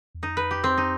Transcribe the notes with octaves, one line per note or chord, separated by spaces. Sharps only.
E2
F2 D#4
B4
G4
C4
D#4